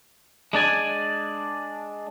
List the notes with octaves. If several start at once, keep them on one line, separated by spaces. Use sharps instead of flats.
G#3 D4 D5 G#5